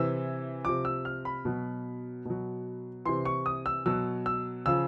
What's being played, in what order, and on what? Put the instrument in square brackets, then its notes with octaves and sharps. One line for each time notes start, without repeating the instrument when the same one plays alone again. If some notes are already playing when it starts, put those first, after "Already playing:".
Already playing: [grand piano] C3 E3 E6
C3 F3 D6
E6
F6
B5
B2 F#3
B2 F#3
C3 E3 C6
C#6
D#6
E6
B2 F#3 E6
E6
C#3 F3 E6